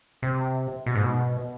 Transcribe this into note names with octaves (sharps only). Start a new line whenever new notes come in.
C3
B2
G#2
B2